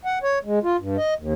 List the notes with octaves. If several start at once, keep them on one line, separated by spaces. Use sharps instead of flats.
F#5
C#5
G#3
F4
G2
D#5
D#2